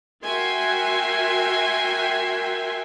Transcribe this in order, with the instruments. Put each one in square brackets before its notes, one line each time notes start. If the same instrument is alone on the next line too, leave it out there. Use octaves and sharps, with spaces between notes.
[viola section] F#4 A#4 E5 G5 G#5 C6